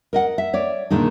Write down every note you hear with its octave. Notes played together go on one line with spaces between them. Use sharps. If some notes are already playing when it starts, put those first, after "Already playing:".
A#4 D#5 F#5
E5
C#5 D5
A#2 D3 D#3 G#3 D#4